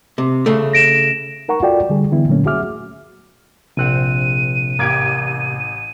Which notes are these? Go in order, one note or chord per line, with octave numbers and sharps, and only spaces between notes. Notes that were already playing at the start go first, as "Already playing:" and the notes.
C3
C#3 A3
A#6 D7 E7
D#4 A#4 F#5 A#5 C#6
F4 F#4 A4 D5 G5
D3 G3 G#4
D3 E3 B3 E4
A#2 D3 F#3 A3 A#3 C#4
F#4 G#4 E5 D6 F6
A#1 C3 C4 F#5 F#6 D#7
A1 A#3 G4 G#6 D7